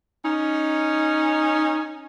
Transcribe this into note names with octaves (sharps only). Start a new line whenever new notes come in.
C#4 D#4